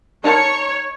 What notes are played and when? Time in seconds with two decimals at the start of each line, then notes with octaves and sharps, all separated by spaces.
0.24 D#4 A#4 C#5 A5